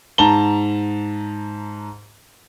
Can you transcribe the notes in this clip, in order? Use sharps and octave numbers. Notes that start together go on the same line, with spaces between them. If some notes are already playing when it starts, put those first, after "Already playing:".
G#2 A5 A#5 G7